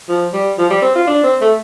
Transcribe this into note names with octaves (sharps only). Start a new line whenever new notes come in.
F3
G3
F3
G3
C4
F4
D4
C4
A3